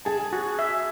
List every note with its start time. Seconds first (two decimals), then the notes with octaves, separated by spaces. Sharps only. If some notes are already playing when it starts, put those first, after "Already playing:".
0.05 G#4 A5
0.33 F#4
0.59 E5